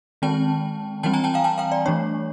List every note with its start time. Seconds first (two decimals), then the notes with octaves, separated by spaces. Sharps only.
0.22 D#3 G#3 C4 G5 A5
1.03 E3 G3 C4 G5 A5
1.14 G#5 A#5
1.24 G5 A5
1.34 F5 G5
1.44 G5 A5
1.58 F5 G5
1.72 D5
1.86 E3 A3 D4 C#5